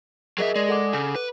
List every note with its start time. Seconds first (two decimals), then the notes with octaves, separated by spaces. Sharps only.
0.38 F#3 G#4 A#4 D#5 E5
0.55 G#3 D5
0.69 A4 F#5 D6
0.93 C#3
1.15 B4